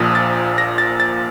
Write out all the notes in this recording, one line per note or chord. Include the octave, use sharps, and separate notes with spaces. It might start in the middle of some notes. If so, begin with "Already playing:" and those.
Already playing: A#1 A#2 F3 D#6
A6
A#6
A6
A6